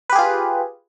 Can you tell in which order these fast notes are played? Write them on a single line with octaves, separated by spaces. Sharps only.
B4 G4 G#4 F4